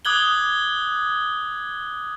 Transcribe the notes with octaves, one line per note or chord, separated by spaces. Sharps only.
D6 D#6 F#6 G#6 F#7 G7